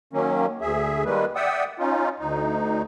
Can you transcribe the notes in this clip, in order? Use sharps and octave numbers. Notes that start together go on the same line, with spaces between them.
D#3 F#3 A#3 C#4
D2 G#4 E5
D#3 G3 G#3 A#3 B4
D5 E5 F#5 G5 D#6 E6
C#4 D#4 F4
D2 D#4